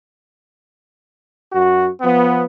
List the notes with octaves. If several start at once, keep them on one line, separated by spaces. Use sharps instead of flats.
F#2 F#4
F3 B3